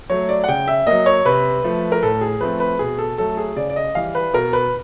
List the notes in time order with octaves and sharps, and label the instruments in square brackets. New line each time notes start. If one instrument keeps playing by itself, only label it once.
[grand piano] F#3 A3 C#5
D5
F#5
C#3 G5
E5
F#3 A#3 D#5
C#5
C3 B4
F3 A3
A#4
A2 A4
G#4
F3 A3 C4 B4
B4
B2 G#4
A4
F#3 A3 A4
G#4
C#3 D5
D5
D#5
E3 G3 F5
B4
B2 A#4
B4